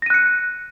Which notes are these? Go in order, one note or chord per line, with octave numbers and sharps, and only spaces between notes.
F#6 A#6 C#7 D#7